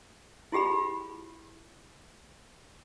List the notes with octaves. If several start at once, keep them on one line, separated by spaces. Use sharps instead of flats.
E4 F4 G4 G#4 B5